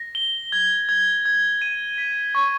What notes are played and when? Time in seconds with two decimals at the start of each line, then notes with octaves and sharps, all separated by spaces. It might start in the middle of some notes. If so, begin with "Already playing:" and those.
Already playing: A#6
0.15 G7
0.52 G#6
0.89 G#6
1.25 G#6
1.62 D#7
1.98 B6
2.35 C#6